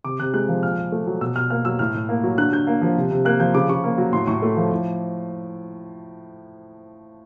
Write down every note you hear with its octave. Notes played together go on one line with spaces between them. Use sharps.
C3 D6
C3 F#6
G#3 F#6
F3
A#2 F6
A#2
A3
F#3
B2 E6
B2 F6
A#3 F6
F#3 E6
A2 F6
A2
A#3
F#3
D3 F#6
D3 G6
A#3
F3
C3
C3
A#3 F#6
F3 G6
C#3 D6
C#3 C#6
A#3
F#3
A2 C6
A2 C#6
A3
F3
A2